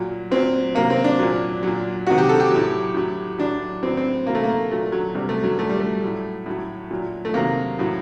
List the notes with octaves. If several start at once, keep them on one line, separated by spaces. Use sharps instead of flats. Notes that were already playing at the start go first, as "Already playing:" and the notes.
Already playing: A#2 F#3
A#2 F#3 C4
C3 F#3 A#3
C4
D4
A#2 F#3
A#2 F#3
C3 D#3 F#3 F#4
G4
A4
G4
A2 F#3
A2 F#3
A2 F#3 D4
A2 F#3 C4
C4
C3 F#3 A#3
A3
A#3
A#2 F#3 A3
F#3
C3 F#3 G3
A3
F#3
A#2 F#3 A3
G3
A3
A2 F#3
A2 F#3
A#2 F#3
A3
C3 D#3 F#3 A#3
A2 F#3